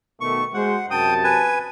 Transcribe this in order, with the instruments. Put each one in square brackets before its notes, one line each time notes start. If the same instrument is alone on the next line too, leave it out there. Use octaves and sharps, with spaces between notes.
[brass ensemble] B2 D#3 A3 [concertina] C#6
[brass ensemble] G#3 F#4 C5 [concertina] F#5
[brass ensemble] F#2 C3 A5 [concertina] G5 D#6
[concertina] B4 G#5